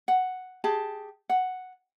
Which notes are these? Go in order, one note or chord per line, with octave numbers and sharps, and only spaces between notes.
F#5
G4 G#4 A5
F#5